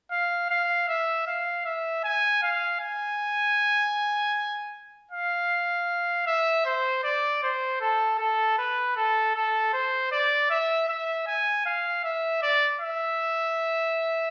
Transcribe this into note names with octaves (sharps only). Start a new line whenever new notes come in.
F5
F5
E5
F5
E5
G#5
F5
G#5
F5
E5
C5
D5
C5
A4
A4
B4
A4
A4
C5
D5
E5
E5
G#5
F5
E5
D5
E5